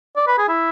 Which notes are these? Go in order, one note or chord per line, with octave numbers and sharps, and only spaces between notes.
D5
B4
G#4
E4